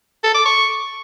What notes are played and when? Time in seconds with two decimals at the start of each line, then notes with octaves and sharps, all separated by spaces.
0.23 A4
0.34 D6
0.45 C#6